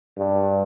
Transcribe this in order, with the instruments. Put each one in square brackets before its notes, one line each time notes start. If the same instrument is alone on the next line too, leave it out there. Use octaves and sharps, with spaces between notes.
[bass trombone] G2